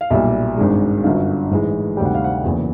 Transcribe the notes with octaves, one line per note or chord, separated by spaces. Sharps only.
F5
B1 A#2 G3 E5
G#1 G2 D#3 G#3
G1 F#2 D3 F#3 F5
A1 G#2 E3 G#3
D2 C3 D#3 G3 G5
F#5
F5
F#5
F#1 E2 C#3 E3